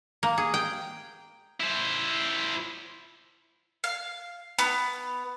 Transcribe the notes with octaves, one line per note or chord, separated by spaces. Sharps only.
A#3
G#4
G5
E4 C5
F5
B3